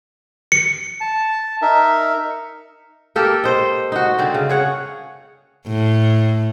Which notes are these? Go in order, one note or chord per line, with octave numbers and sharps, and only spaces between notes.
C#7
A5
D#4 A#4 E5
A#3 G4 A4 A#4
C5 D#5
D#4 F#4
D3 C4
C#3
G#4 C#5 F#5
A2